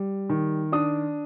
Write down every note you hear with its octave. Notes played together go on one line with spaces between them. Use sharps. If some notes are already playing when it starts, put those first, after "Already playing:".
Already playing: G3
D#3
D4 D#6